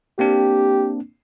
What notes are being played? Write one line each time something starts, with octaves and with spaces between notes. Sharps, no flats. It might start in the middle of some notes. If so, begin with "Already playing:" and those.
A#3 C4 D4 G4